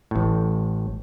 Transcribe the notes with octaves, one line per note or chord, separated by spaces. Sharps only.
A1 A2